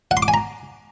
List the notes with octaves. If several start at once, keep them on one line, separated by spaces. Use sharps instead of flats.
F#5
C6
D6
G#5
A#5